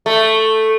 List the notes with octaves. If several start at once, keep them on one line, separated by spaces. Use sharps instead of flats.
A3